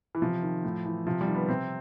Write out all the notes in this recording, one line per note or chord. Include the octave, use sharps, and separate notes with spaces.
E3
C3 F3
D#3
A2
E3
C3 F3
G3
D#3
B3
C3 C4